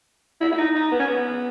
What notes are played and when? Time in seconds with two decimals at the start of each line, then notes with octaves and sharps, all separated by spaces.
0.41 E4
0.52 E4
0.58 D#4
0.74 D#4
0.91 B3
0.99 C#4
1.07 B3